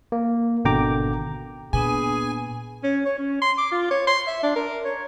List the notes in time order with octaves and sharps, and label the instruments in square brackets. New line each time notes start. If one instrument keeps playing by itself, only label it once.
[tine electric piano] A#3
G#1 B2 D3 G5 A#5 D6
[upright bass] A#2 [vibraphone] B3 D4 B4 [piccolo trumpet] G#4 [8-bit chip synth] G#5
[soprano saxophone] C#4
C#5
C#4
C6
D6
F4
C#5
C6
E5
D4
A#4
C#5